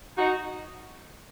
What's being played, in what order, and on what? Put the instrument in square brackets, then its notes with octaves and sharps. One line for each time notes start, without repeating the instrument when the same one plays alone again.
[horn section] D#4 F#4